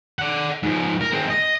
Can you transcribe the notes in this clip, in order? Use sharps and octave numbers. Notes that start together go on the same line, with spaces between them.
D5 F#5
G#2 F3
A#4
G#3 C4
D#5